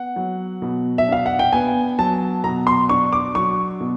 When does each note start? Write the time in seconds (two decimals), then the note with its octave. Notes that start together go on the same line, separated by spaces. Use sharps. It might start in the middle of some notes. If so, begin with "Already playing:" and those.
Already playing: B3 F#5
0.16 F#3
0.62 B2
0.98 E5
1.08 D4 F5
1.26 F#5
1.39 G5
1.53 B3 G#5
1.99 F#3 A5
2.44 B2 A#5
2.67 C6
2.89 D4 C#6
3.13 D6
3.35 F#3 C#6
3.80 B2